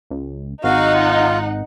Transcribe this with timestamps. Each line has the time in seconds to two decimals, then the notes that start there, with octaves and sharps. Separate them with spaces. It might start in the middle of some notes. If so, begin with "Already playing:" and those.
0.11 C#2
0.64 G#1 D#4 F#4 F5 F#5
0.94 F4